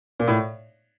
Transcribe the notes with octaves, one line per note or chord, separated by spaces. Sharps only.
A#2
A2